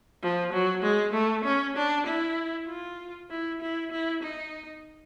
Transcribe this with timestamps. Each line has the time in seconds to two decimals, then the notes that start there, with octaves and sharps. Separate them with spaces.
0.22 F3
0.53 F#3
0.83 G#3
1.13 A3
1.45 C#4
1.76 D4
2.06 E4
2.68 F4
3.30 E4
3.61 E4
3.91 E4
4.23 D#4